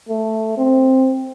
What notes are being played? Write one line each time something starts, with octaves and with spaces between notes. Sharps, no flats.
A3
C4